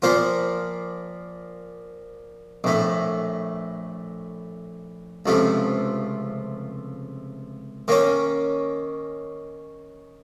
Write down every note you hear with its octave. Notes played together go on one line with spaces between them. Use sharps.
A#2 F3 A#3 F4 C5
A#1 A2 A3
C#2 C3 F3 A3
D#3 A#3 C#4